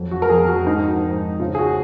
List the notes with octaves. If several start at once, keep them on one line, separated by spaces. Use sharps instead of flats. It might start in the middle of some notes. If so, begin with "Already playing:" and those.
Already playing: F2 F#3
F#4
A#4
F2 G#4
F#4
G#2 D#4
G#2
C#3 F4
G#4
F#4